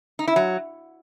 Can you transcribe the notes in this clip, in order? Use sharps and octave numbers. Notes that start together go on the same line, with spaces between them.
D#4
E4
F#3